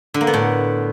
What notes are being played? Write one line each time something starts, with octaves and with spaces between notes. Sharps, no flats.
D3
A#3
B3
A2